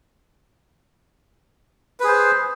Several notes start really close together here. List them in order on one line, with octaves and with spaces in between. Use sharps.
B4 G#4 C5